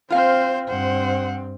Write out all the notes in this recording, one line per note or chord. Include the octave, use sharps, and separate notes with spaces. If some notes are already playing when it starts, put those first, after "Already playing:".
C4 F4 C5 F5
G2 C4 C5 F#5